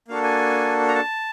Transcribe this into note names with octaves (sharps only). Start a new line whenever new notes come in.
A#3 D4 F#4 A4 F5
G#5
A#5
A5